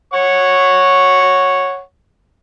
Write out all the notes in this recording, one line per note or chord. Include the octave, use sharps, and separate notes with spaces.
C#5 F#5 C#6